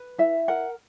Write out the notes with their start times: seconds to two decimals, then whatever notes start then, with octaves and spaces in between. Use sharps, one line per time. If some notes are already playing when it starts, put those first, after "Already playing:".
Already playing: B4
0.18 E4 E5
0.48 A#4 F#5